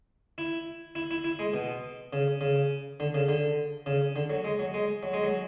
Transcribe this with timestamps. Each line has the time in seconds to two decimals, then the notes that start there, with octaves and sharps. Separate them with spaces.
0.38 E4
0.95 E4
1.11 E4
1.24 E4
1.39 G#3
1.54 B2
2.13 C#3
2.41 C#3
3.00 D3
3.14 C#3
3.29 D3
3.86 C#3
4.16 D3
4.30 F#3
4.44 G#3
4.59 F#3
4.74 G#3
5.03 F#3
5.14 G#3
5.23 F#3